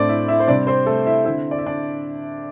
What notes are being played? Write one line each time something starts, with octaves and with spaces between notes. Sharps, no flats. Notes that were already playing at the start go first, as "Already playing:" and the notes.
Already playing: A2 A3 C4 D4 D5
E4 E5
E4 E5
C5
C3 G3 C4 D4 D5
C4 C5
A3 A4
E4 E5
D3 C4 E4 E5
D5
E5
D4 D5